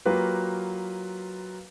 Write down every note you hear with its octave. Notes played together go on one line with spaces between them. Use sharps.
F#3 A#3 F4 G4 B4